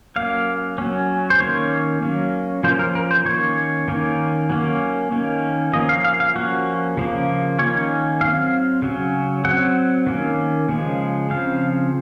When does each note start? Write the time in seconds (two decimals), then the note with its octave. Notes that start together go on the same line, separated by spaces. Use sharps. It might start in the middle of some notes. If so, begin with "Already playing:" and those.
0.16 F#3 A#3 C#4 F5
0.78 F#3 C#4
1.30 C5
1.40 D#3 A#3 C#4 C#5
2.02 F#3 A#3 C#4
2.64 F3 A#3 C#4 C5
2.79 A#4
2.95 A#4
3.11 C5
3.25 D#3 A#3 C#4 C#5
3.88 D#3 A#3 C#4
4.50 F#3 A#3 C#4
5.12 D#3 A#3 C#4
5.73 F3 A#3 C#4 D#5
5.89 F5
6.04 F5
6.20 F5
6.35 F3 A#3 C#4 F#4
6.97 C#3 F3 A#3
7.59 D#3 A#3 C#4 C#5
8.21 F#3 C4 F5
8.82 C#3 F#3 C#4
9.45 F#3 C4 F#5
10.06 D#3 A#3 C#4
10.69 C#3 F3 G#3
11.30 C#3 F3 C4 F5